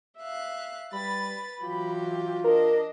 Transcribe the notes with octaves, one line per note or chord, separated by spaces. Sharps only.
E5 F5 F#6
G3 B4 B5 A6
E3 F#3 F4 G4
D4 A#4 D#5